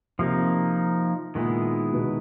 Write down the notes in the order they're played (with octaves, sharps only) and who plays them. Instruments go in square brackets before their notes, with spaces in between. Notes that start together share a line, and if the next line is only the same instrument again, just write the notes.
[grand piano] C3 [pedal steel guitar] F3 A#3 D#4
[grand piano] A#2 [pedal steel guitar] D#3 G#3 B3 E4
[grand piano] B2